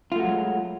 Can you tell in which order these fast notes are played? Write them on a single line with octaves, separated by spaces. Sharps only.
F4 A3 F#4 F#3 G#3